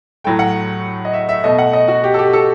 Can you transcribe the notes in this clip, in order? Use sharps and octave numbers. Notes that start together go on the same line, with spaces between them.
A2 F#3 A3 G5
F#5
D#5
E5
E5
B2 A3 D#5
F#5
D#5
F#4
G4
A4
G4
A4